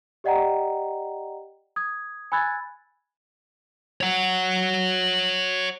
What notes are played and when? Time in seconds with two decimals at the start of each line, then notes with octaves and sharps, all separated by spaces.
0.24 G4 D5 D#5 F#5 G5 A#5
1.76 D#6 G#6
2.32 G#5 B5 E6 F#6 G#6 A6
4.01 C#5 F#5